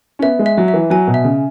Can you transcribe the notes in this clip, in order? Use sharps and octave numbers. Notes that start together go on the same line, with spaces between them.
C#4
B3 E5
G#3
E5
F#3
E5
E3
F#3 G#5
B2
E5
C#3